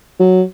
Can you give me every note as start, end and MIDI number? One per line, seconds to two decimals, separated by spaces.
0.20 0.42 54